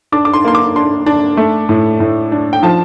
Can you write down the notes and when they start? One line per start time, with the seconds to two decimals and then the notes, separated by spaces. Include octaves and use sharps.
0.12 D4 D6
0.25 D6
0.34 C6
0.44 A#3 C6
0.55 D6
0.76 D4 C6
1.06 D4
1.37 A3
1.69 A2
2.00 A2
2.32 D4
2.53 G5
2.63 F3 A5